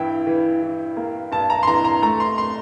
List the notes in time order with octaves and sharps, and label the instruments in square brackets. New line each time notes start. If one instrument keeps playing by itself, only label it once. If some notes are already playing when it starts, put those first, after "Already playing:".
Already playing: [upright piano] G2 E3 E4 G5
E3
E3
A#3
G2 A5
A#5
C6
E3 A#5
A#5
A3 A#5
C6
C6